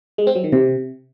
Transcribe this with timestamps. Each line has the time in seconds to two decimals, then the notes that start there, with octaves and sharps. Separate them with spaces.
0.18 G#3
0.27 C4
0.35 F#3
0.44 D#3
0.52 C3